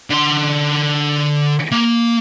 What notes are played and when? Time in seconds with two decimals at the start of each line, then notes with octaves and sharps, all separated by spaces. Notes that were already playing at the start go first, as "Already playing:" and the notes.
0.10 D3 C6
1.72 A#3